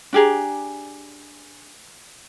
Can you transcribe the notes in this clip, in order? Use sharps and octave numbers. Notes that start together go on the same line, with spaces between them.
D4 G4 G#4 A#5